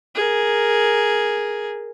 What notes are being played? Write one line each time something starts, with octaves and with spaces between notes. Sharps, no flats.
G#4 A#4